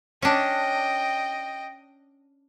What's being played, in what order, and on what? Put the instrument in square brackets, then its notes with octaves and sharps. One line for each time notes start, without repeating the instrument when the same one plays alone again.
[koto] C#4 D4 [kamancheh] D#5 G5